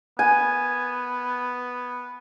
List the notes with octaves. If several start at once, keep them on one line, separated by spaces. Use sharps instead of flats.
B3 G#5